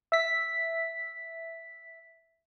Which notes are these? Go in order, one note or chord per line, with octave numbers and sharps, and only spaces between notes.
E5 B6